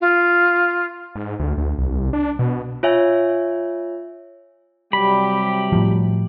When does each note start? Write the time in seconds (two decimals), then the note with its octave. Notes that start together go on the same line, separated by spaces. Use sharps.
0.01 F4
1.16 G#2
1.40 D2
1.58 D2
1.78 C2
2.13 D4
2.39 B2
2.83 F4 C#5 E5 G#5
4.93 C3 F#3 G3 G4 B5
5.72 A2 F3